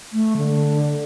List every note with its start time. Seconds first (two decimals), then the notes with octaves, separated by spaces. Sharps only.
0.13 A3
0.37 D3